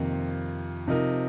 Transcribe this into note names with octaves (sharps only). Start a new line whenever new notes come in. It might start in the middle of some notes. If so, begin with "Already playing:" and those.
Already playing: F2 C3 D#3 A#3 F4
C3 F3 D#4 A#4